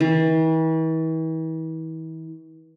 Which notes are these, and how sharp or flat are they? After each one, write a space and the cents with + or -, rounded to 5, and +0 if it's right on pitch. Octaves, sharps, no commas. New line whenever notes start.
E3 -40